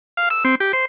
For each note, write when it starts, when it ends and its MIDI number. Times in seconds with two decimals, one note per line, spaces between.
0.17 0.29 77
0.30 0.44 88
0.45 0.55 60
0.60 0.72 67
0.73 0.85 72